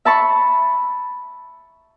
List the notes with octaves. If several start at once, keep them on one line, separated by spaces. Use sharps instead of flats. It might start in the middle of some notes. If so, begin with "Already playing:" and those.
E5 A5 B5 C#6